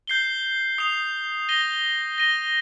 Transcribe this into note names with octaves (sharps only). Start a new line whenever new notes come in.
G6 C7 G7
D#6 C7 F7
A#6 D#7 G7
A#6 D#7 G7